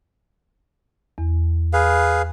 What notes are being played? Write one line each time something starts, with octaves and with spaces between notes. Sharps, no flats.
E2
G#4 B4 F5